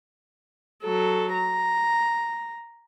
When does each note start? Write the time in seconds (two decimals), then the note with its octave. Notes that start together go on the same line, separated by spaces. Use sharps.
0.83 F#3 A4
1.34 A#5